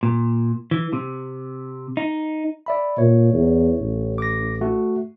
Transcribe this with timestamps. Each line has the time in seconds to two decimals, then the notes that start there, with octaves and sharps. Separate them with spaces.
0.03 A#2
0.71 E3
0.93 C3
1.97 D#4
2.66 D5 E5 B5
2.98 A#2 C#5
3.34 E2
3.80 A1
4.18 D6 A#6
4.61 A3 F#4